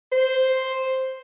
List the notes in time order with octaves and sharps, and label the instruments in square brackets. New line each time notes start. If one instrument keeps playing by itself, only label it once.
[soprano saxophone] C5